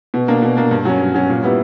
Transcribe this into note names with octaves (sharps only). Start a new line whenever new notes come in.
B2
A#3 D4
B2
A#3 D4
G2
F#3 C#4
G2
F#3 C#4
A#2
G3 B3 E4